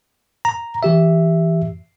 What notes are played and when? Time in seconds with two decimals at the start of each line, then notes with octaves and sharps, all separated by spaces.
0.45 A#5
0.83 E3 G4 E5